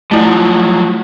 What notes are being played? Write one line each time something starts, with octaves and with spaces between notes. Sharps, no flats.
F3 F#3 A3 E4